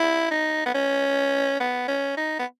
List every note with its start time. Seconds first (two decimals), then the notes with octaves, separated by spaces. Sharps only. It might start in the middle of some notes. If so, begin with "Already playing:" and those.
Already playing: E4
0.31 D#4
0.66 B3
0.75 C#4
1.60 B3
1.88 C#4
2.17 D#4
2.39 B3